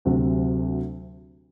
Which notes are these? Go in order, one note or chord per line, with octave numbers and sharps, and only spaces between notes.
D2 C3 F#3 C4 F#4